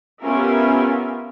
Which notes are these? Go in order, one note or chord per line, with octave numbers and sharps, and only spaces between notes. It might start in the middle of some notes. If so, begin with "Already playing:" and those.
B3 C#4 F4 G4 A#4 E5